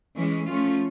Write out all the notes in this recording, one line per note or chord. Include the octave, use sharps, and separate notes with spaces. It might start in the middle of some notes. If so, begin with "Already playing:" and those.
E3 G#3 C#4
F3 A3 C#4 F4